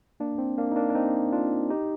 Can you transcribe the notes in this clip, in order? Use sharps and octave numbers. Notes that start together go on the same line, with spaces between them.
A#3 D4
C4
A#3 D4
D#4
A#3 D4
D4
C4 D#4
D4 F4
D#4 G4